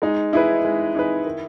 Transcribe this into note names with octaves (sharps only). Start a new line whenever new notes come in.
G#3 D#4
D#4 E4 G#4 B4
G#3
D#4 G#4 B4
D#3